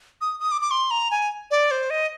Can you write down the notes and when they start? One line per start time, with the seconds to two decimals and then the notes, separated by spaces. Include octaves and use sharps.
0.21 D#6
0.40 D#6
0.51 D6
0.61 D6
0.71 C6
0.91 A#5
1.11 G#5
1.51 D5
1.71 C5
1.90 D#5